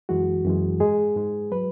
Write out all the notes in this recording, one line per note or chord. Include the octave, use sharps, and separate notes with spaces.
F#2 E3 G#3 F#4
F#2 E3 G#3
G#2 G#3 G#4
G#2 G#3
F#3 B4